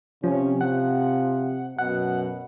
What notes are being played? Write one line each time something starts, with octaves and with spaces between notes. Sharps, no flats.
C3 F3 C#4
F3 F#5
F#2 B2 F#5